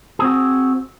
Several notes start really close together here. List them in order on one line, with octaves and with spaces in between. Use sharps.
G#4 C4 F#4